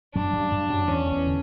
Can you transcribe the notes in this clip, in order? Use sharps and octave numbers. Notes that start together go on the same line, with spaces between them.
F#2 F#3 D4
G2 G3
G2 G3
F#2 F#3
E2 E3 C#4
D3
E2 E3
D3